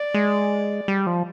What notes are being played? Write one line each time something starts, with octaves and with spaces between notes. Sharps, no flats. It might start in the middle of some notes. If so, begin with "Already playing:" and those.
Already playing: D5
G#3
G3
F3